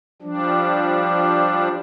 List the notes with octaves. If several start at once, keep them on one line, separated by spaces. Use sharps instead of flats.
F3 G3 D4